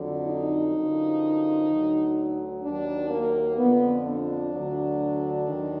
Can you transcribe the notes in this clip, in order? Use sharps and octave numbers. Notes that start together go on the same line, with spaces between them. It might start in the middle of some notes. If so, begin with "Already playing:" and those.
Already playing: F2 D3 F#3
D#4
F#2 D3 F3
D2 D3 F#3
D#2 D#3 F#3 D4
A#3
F2 D3 F3 B3
D4
D2 D3 F#3
D#2 D#3 F#3